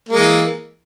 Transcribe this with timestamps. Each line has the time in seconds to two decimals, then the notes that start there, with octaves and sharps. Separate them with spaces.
0.09 A#3
0.13 G#3
0.17 E3